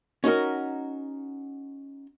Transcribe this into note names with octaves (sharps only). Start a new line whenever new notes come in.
C#4 D#4 F#4 A#4